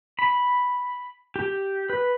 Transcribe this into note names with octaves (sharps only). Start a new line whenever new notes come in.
B5
G4
B4